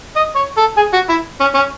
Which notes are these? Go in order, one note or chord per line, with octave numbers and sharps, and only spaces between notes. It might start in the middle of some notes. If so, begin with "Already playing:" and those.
D#5
C#5
A4
G#4
F#4
E4
C#4
C#4